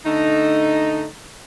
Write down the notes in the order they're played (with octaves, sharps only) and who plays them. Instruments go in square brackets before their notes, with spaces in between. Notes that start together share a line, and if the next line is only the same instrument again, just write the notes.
[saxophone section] D3 A3 D#4